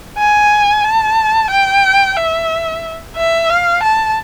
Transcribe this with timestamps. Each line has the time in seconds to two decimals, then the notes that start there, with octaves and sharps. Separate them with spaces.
0.18 G#5
0.84 A5
1.50 G5
2.17 E5
3.16 E5
3.50 F5
3.83 A5